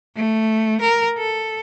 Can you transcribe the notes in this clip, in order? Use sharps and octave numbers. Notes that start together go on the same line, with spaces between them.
A3
A#4
A4